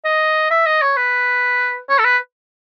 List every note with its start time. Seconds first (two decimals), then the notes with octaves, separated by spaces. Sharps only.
0.05 D#5
0.51 E5
0.66 D#5
0.82 C#5
0.97 B4
1.89 C#5
1.99 A4
2.04 B4